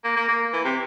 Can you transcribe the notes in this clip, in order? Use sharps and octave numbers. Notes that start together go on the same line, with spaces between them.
A#3
A#3
A#3
E3
C3